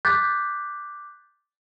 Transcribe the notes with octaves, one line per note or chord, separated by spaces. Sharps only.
D6 F#6 G6 A6 B6